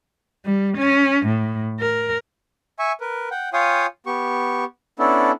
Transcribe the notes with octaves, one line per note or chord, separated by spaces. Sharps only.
G3
C#4
A2
A#4
E5 G#5 C#6
A#4 B4
F#5 G5
F4 C#5 F5 G5 G#5 D#6
B3 G4 C#6
B3 C#4 D4 E4 A4